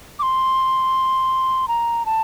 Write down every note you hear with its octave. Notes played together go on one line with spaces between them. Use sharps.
D6
C6
A#5
A5